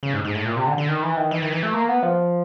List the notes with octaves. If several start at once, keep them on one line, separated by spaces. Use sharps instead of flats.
C#3
G#2
G#2
A2
A#2
C3
D3
D3
D#3
E3
D#3
E3
D#3
E3
A3
A#3
B3
F3